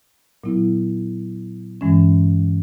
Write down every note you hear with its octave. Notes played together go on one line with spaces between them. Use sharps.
A#2 F#3 B3 E4
G2 E3 G#3 C#4